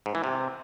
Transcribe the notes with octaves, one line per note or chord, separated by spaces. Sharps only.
G#2
E3
C3